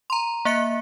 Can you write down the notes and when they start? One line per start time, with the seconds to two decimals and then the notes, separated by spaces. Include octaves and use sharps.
0.10 A#5 C6
0.45 A#3 E5 F#6 C#7